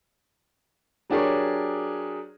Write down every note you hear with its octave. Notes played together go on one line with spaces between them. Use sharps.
F#3 D4 G4 G#4 A#4 C#5